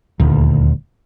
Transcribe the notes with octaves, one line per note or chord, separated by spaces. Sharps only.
D#1 D2